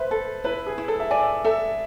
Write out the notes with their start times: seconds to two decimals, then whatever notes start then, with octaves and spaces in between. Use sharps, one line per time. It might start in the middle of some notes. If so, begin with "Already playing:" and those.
Already playing: B4 C5 E5
0.11 A4
0.44 E4 B4
0.66 G#4
0.78 E4
0.88 A4
1.00 E5
1.11 D5 G#5
1.44 A4 E5